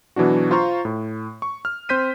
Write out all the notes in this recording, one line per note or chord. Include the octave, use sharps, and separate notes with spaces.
B2 E3 F#3 D4 F#4
F4 C5 F5 A#5 C#6
A2
C#6
F6
C4 C5 G6 B6 D#7